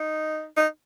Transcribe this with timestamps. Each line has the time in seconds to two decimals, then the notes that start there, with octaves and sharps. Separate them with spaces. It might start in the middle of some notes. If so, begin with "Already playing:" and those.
Already playing: D#4
0.57 D#4